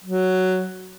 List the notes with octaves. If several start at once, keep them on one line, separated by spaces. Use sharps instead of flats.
F#3